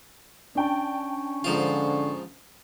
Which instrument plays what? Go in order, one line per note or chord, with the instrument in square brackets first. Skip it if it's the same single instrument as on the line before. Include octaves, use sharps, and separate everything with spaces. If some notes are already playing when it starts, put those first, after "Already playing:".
[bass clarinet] C#4 [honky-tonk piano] D4 G5 A5
[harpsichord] G#2 F3 F4 [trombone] D3